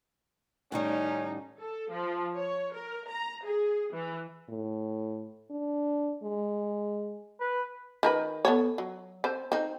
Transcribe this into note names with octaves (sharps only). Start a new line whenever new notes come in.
A2 D#3 G3 C#4 D#4
A4
F3
C#5
A#4
A#5
G#4
E3
A2
D4
G#3
B4
D#3 A#4 B4
B3 A4 C#5
F#3
C4 C5
C4 D#4